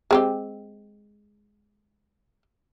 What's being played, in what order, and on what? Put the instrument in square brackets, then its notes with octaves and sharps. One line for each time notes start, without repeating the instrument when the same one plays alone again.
[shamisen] G#3 C4 G4